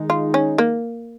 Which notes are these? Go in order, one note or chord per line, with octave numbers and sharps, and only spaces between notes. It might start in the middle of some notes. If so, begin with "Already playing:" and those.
Already playing: D#3 G#3 D#4
F4
C#4
A#3